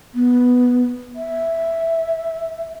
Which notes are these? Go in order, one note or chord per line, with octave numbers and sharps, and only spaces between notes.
B3
E5